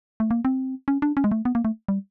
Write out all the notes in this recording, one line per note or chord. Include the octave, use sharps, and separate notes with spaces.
A3
A#3
C4
C#4
D4
C#4
G#3
A3
B3
A#3
A3
G3